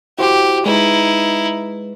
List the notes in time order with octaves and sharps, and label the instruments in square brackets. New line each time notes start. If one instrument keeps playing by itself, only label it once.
[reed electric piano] E4 F#4 C5 [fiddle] G4
[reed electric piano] G#3 B4 [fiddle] D#4 E4